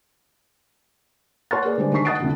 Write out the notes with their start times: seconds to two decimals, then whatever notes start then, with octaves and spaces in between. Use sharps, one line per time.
1.51 C#5 F#5 C6 C#6 F6 A6
1.65 A#3 G#4 B4 D5
1.78 D3 G3 G#3 C5 D5
1.92 D#3 G#3 D4 C#6 B6 C7
2.05 D#5 F#5 D#6 A6 C7 D7
2.20 C2 F2 D3